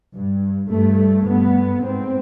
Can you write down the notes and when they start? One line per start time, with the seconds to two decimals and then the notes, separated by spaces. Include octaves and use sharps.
0.14 G2
0.71 G2 A3
1.28 G2 B3
1.84 G#2 C4